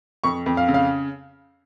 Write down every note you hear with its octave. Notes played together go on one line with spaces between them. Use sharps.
F2 C#6
F2
F5
C#3
F5